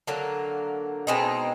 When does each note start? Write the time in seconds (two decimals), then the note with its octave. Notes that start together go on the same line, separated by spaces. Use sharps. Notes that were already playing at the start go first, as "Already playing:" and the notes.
0.07 D3 F#3 A#3
1.07 B2 G#3 C4 D#4